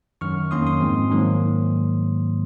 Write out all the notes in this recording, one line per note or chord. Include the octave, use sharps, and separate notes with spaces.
F#2 D#3 F#3 C#6 F6
F2 D#3 A#3 C#4 C6 D#6
C6 D#6
G#2 F3 G#3 C4
G#2 D#3 F#3 A#3